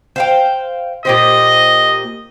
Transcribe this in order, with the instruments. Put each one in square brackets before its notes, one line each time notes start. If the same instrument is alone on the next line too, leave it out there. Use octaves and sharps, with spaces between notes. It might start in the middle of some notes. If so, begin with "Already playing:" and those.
[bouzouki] C5 F5 G5
[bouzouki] A#2 G4 C5 [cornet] D#5